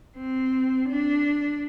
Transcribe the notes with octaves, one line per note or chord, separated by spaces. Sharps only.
C4
D4